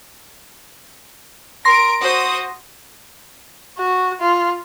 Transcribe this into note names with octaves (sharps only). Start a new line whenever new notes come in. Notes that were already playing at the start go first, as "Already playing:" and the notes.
A#4 C6 A#6 D7
F#4 C5 D#6
F#4
F4